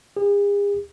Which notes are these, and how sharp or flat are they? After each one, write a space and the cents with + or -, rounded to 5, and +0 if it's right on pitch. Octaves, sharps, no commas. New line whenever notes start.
G#4 -45